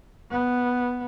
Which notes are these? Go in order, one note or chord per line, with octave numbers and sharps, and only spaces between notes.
B3